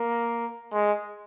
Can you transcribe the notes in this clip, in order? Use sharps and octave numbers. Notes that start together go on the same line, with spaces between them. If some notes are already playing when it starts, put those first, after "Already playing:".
Already playing: A#3
G#3